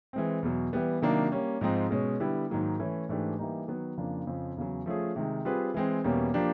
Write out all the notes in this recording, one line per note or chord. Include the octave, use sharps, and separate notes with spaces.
E3 G#3 C4
E2 B2 F#3
E3 G3 B3
C3 D#3 F#3 A#3 D4
G3 A#3 C#4
G#2 F3 G#3 C4 D#4
B2 G#3 C#4
D3 G3 B3 E4
G#2 D#3 F#3 A#3
E3 A3 C#4 E4
G#2 E3 A3 D4 G4
E3 G3 A#3 D#4
D#3 F#3 B3
F2 C#3 F3 A#3 D4
F2 C#3 F3
E2 C#3 F#3
F3 A3 C#4 F4 G#4
C3 D#3 G#3
G3 C4 F4 G#4 B4
E3 G#3 C4
E2 B2 G3 A#3 C#4
F3 A#3 D4 G4